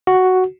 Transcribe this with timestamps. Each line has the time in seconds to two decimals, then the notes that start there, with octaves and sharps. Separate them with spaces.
0.07 F#4